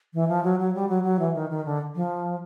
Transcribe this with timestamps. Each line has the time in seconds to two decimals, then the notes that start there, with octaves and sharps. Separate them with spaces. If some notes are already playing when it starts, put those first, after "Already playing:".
0.14 E3
0.29 F3
0.44 F#3
0.60 F#3
0.75 G3
0.89 F#3
1.04 F#3
1.19 E3
1.34 D#3
1.50 D#3
1.65 D3
1.95 F3